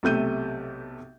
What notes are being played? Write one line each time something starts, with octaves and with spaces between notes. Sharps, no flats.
B1 C3 A3 G6 D#7